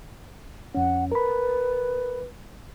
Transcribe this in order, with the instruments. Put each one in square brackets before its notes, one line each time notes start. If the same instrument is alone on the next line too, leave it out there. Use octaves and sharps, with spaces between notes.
[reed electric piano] F2 C#4 [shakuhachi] F#5
[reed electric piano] A#4 B5 [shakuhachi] B4